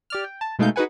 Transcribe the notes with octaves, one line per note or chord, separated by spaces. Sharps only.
G4 D5 F6
G5
A5
B2 G#3 A3 D#4 F5 G6
D#4 F#4 G#4 B4 F#5 G#5